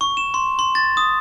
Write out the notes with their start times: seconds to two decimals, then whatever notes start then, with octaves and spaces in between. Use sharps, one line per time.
0.01 C#6
0.17 E7
0.34 C6
0.59 C6
0.75 A6
0.97 D#6